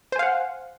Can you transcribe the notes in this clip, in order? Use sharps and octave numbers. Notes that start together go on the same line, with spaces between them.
C5 F5 F#5 G#5